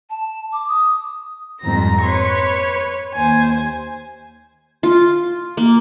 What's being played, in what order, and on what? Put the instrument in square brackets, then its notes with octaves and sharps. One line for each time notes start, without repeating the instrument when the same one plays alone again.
[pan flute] A5
D6
D#6
[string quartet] F2 G#2 G3 C4 A#5 A#6
B4 C#5 C6 C#6
D#2 C5 G#5
[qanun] F4
A#3